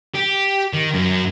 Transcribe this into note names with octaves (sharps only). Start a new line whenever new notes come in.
G4
D#3
F#2